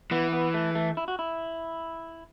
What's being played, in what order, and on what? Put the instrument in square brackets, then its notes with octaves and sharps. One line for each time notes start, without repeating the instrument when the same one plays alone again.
[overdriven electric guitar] E3 [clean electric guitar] B3
[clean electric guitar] B3
A3
A3
E4
F#4
E4